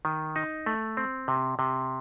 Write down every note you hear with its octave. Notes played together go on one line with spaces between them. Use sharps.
D#3
D#4
A3
C4
C3
C3